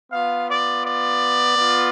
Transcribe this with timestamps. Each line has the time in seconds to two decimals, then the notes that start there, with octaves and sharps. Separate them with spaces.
0.12 B3 F4 F5
0.48 D5
0.84 D5
1.56 B3 F4